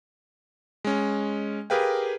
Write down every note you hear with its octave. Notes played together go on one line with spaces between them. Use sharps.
G#3 C#4
G4 G#4 A#4 B4 F5 G5